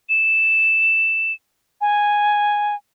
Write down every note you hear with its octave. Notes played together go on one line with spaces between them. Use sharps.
E7
G#5